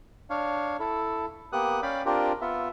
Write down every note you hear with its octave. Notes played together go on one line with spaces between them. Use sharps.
D4 C#5 F5
E4 A4
A#3 B3 G4 D#6 F#6
C#4 D5 F5 G5 B5 D6
C4 D4 F4 G4 A#4
B3 F4 E5